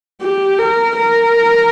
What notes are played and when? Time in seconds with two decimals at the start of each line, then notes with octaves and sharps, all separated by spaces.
0.22 G4
0.59 A#4
0.97 A#4